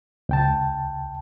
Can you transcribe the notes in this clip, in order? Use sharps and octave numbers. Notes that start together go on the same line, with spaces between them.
C#2 G5 A5